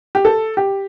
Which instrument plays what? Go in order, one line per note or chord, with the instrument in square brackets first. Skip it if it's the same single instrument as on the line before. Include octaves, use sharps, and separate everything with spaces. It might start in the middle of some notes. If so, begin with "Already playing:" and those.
[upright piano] G4
A4
G4